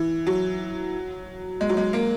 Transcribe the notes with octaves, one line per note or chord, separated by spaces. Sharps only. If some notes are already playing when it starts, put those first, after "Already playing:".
Already playing: E3
F#3
G#3
F#3
G#3
A#3